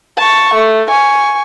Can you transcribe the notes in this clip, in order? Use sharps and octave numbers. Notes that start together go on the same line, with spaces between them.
A5 C#6
A3
G#5 C#6